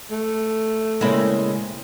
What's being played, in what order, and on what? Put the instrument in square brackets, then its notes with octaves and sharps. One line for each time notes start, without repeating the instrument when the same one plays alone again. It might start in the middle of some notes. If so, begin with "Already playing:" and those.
[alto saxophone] A3
[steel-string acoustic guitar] A#2 C#3 [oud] G#3 C4 E4